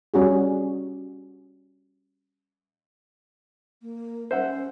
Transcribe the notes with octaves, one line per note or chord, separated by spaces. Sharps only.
G3 C#4 F#4 G#4
A#3
C#4 C5 E5 F#5